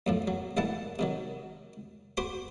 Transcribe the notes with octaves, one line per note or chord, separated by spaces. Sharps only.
F#2 A2 F3
F#3
A1 G3 A#3 E4 F#5 A5
C3 D#3 F#3
F#4 C5 B5 C6 D6